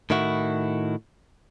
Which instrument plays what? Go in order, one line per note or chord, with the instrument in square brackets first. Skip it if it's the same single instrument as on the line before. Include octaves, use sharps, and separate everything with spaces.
[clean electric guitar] A2 D#3 E4 F#4